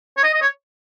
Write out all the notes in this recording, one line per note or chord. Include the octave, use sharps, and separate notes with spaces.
C#5
D#5
D#5
C#5